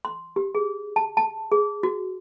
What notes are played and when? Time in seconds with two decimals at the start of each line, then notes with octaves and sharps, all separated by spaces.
0.05 C6
0.36 G4
0.55 G#4
0.96 A5
1.17 A5
1.52 G#4
1.83 F#4